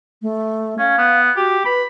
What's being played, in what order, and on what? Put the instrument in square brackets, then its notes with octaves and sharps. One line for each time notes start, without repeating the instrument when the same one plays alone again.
[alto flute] A3
[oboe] C#4 [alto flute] F5
[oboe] B3
[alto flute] F#4 [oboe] G4
[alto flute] B4 [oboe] B5